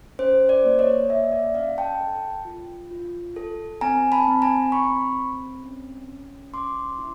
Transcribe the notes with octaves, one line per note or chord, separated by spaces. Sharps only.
C#4 C5
C5 D5
A#3
C#5 D#5
A#3 D5 E5
D5 E5
C#4 D#5 F5
G5 A5
A4
F4
F4
A4
C4 G#5 A#5
A5 B5
C4
G#5 A#5
C4 B5 C#6
C4
C#4
C#4
C#4 C6 D6
E4